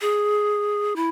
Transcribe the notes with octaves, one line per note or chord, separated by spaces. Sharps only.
G#4
E4